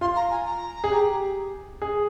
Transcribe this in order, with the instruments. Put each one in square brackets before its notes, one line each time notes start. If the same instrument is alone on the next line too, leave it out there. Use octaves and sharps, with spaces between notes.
[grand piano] F4 [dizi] C6
[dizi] A#5
G#5
A#5
[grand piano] G#4
G4
G#4